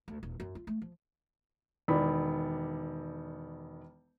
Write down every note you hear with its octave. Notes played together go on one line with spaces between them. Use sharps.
D2
D#1
F#2
F4
A3
F3
E1 D#3 D5 B5